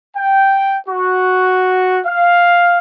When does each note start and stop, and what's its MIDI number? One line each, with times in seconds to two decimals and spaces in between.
0.15 0.76 79
0.87 1.97 66
2.05 2.78 77